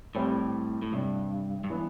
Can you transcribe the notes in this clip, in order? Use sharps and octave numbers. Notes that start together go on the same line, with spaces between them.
A2 G3 C4 E4 G4
A2
G2 C3 G3 D4
G2
E3 B3 D4